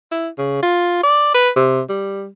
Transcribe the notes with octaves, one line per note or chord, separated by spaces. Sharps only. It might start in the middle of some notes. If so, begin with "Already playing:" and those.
E4
C#3
F4
D5
B4
C3
G3